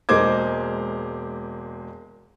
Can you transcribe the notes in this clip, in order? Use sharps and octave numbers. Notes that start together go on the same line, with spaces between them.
E1 G#3 A#3 C5 D6 G#6